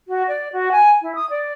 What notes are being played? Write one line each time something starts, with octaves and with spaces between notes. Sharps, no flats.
F#4
D5
F#4
G#5
E4
D#6
D5